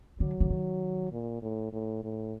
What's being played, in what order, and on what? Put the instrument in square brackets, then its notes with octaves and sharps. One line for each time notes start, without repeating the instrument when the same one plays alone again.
[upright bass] D3 [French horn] F#3
[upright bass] D3
D#3
[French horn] A#2
A2
A2
A2